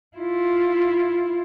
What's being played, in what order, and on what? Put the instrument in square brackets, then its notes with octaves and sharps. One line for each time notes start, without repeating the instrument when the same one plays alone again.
[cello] E4 F4